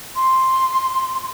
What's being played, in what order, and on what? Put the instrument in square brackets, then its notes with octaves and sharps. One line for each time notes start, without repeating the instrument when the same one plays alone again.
[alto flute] C6